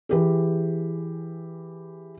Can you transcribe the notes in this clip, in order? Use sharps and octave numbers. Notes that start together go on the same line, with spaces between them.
E3 G4 G#4